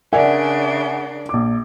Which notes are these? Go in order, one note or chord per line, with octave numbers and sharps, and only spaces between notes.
C#3 D4 A#4 D5 E5 F#5 G#5
A#1 D6